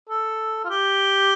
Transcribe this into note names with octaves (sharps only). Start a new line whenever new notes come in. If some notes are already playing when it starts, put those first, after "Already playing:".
A4
F4
G4